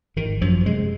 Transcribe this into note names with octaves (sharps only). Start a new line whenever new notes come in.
G#1 D#3
F#2 F3
C3 G#3